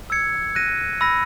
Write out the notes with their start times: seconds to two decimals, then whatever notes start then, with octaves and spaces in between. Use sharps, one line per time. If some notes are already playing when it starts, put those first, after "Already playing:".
0.10 E6 G#6 C#7
0.55 F#6 A#6 D#7
1.01 B5 E6 A#6